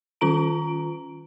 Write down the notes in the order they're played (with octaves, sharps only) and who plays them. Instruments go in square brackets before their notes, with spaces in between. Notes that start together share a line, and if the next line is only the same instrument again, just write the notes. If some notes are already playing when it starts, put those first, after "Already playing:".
[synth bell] D#3 C#4 F4 A#5 D7